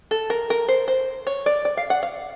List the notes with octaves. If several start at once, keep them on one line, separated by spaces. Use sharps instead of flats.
A4
A#4
A#4
C5
C5
C#5
D5
D5
F5
F#5
F5